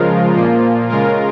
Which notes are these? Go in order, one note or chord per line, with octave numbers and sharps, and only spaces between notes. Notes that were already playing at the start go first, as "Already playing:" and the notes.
Already playing: C#3 F3 G#3 F4 A#4
A#2 F3 A#3 F4
C#3 G#3 F4 A#4